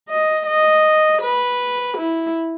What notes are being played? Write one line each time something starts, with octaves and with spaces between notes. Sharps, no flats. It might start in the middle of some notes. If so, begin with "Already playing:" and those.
D#5
D#5
B4
E4